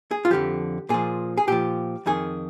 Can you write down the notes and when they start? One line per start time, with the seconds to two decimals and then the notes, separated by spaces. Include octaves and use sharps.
0.11 G#4
0.25 F4
0.30 F2 D3 F3 G4
0.89 A#2 F3 G#4
1.38 G#4
1.47 A#2 F3 G4
2.06 F2 D#3 G#4